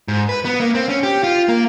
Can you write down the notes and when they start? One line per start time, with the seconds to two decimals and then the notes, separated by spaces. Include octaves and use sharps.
0.08 G#2
0.29 B4
0.45 B3
0.60 A#3
0.75 C4
0.89 C#4
1.03 G4
1.24 F4
1.48 A#3